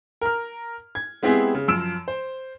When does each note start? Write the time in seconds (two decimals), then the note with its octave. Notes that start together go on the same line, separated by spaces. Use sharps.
0.21 A#4 F6
0.95 G#6
1.23 G#3 B3 C4 E4 G4 G#4
1.55 C#3
1.68 F#2 F3 E6 D7 E7
2.08 C5